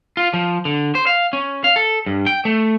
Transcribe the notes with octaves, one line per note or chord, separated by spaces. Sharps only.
F4
F3
D3
C5
F5
C#4
F5
A4
G2
G5
A3